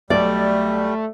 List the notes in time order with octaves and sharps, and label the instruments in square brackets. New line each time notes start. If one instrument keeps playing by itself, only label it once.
[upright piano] B1 [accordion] G3 [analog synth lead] A3 [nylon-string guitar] D5